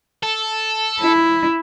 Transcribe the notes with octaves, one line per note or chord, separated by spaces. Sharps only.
A4
E4